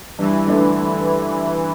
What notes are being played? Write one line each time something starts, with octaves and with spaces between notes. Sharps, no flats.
G2 E3
D3 A3 D4